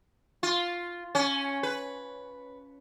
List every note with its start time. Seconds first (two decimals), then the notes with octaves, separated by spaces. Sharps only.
0.43 F4
1.15 C#4
1.63 B4